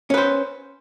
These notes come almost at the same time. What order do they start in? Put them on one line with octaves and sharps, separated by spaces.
C#4 B4 C5